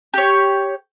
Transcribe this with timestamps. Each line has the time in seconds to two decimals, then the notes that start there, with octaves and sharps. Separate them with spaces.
0.14 G4 C#5